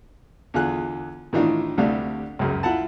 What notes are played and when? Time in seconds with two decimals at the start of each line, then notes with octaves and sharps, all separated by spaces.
0.54 E2 D3 F4 G#4 F#6
1.33 A2 D#3 E3 D4 F4
1.78 D2 C3 G3 A3 D4 F5
2.39 C#2 F#2 C#3
2.63 E4 F4 F#5 A5